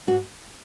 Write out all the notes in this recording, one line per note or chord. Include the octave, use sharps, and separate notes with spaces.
G#2 F#4